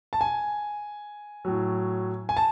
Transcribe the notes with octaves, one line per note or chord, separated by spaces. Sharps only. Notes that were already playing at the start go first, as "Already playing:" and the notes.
A5
G#5
A2 F#3
G#5
A5